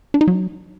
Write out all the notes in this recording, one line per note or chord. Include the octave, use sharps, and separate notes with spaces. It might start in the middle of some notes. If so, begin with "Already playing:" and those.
D4
D#4
F#3